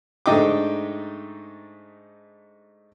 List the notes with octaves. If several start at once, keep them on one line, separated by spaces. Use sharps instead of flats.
G#2 A3 D4 D#4 G5 D6